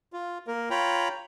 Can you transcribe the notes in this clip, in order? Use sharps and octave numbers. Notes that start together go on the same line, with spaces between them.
F4
A#3 A#4
F4 C#5 G5 A#5 B5